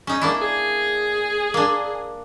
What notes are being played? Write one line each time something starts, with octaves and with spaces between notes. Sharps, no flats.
C#4 D#4
A#3 D4 E4
G#4
A#3 D4